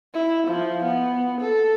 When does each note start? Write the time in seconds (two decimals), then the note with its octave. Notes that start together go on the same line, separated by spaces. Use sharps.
0.14 E4
0.48 F3
0.84 B3
1.41 A4